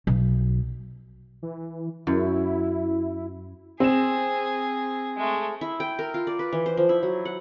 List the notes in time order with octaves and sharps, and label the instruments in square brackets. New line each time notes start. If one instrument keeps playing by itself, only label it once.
[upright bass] B1
[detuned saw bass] E3
[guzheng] F#2 [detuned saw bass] E4
[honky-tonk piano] C4 E7 [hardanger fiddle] G#4
[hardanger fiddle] G#3 A3
[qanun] E4
G5
A#4
F4
D5
B4
E3
C5
F3
E4
F#3
F#5